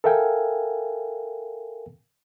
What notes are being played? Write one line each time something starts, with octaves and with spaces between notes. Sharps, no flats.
A4 A#4 E5 F5 G5 G#5